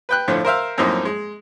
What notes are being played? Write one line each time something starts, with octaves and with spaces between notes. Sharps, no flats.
B4 G5 F#6
F2 A2 D3 F3
A#4 C5 E5 F5
F#2 A2 F3 A#3 C4 D#4
G#3